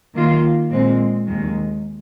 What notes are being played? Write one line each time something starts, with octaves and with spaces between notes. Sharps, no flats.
D#3 A#3 F4
A#2 G#3 C4
D#2 D#3 G#3